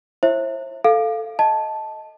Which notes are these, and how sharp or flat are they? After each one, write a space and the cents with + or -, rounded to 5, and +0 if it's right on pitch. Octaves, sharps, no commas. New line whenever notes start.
E4 +30 C5 +45 E5 +0
A4 +0 F5 +0
D#5 +10 A5 -5